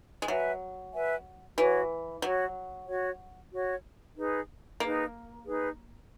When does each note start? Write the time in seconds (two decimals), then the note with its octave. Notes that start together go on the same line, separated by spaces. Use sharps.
0.22 G#3
0.28 F#3 B4 E5 G#5
0.93 B4 E5 G#5
1.58 E3 F#4 C#5 F#5
2.22 F#3 F#4 C#5 F#5
2.87 F#4 C#5 F#5
3.52 F#4 C#5 F#5
4.16 D#4 G#4 B4
4.80 A#3 D#4 G#4 B4
5.45 D#4 G#4 B4